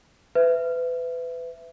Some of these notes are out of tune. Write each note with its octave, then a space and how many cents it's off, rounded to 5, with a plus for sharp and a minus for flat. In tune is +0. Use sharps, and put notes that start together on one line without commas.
B4 +30 E5 +15